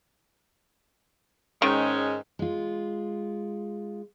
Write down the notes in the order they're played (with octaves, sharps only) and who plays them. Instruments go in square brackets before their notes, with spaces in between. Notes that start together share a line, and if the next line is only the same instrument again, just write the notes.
[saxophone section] G#2 G#3 C#4 [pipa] D#3
[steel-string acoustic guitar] G#3 F4